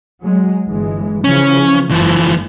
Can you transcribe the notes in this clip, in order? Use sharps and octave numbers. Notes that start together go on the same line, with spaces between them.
F#3 G#3
G1 E3 G#3
C#3 E3 F3 C#4
F#1 G#2 E3 F3